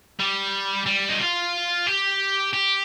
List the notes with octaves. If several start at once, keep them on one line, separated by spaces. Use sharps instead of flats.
G3
G3
D#4
F4
G4
G4